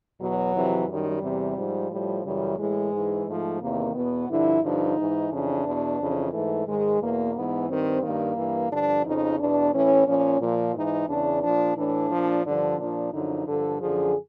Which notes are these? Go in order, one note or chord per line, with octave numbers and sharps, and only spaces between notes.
E2 B2 F#3
F2 C3 E3
F#2 D#3 G3
E2 C3 E3
G#2 F3
A2 F3 G3
F#2 C#3 E3 G3
A2 E3 G#3
G#2 E3
G#2 F3 A3
E2 C3 D#3 A#3
E2 B2 B3
G2 D3 F3 E4
G2 D3 F3 D#4
G#2 E3
F2 C#3 E3 D4
E2 B2
F2 C#3 E3
G#2 E3 A3
G#2 D#3 G#3
E2 B2 A#3
G#2 E3 B3
G2 D#3 C4
G2 D#3 A#3
G2 E3
G2 D3 F3 D4
F2 C#3 F3 D#4
E2 B2 D4
A2 E3 C#4
A#2 F3 C#4
A#2 F3
G#2 E3 D#4
E2 C#3 E3 D4
A#2 F3 D4
A2 E3 D4
A#2 F3
G2 D3 F3 D4
A#2 F3 D4
F#2 D3 F3 D#4
G2 D3 F3 A4
F#2 D3 F3 G#4